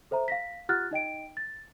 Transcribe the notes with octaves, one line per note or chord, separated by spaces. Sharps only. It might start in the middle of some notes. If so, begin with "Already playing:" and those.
A4 C5 E5 A#5
F5 A#6 B6
F4 G4 F#5 F6 F#6 A6
D#4 D#5 G5 D7
A6